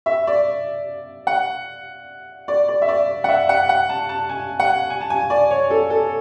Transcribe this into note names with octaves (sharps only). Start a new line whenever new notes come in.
E5
D5
F#5
D5
D5
E5
D5
F#5
E5
F#5
F#5
A5
A5
G#5
F#5
G#5
A5
G#5
D5
C#5
A4
A4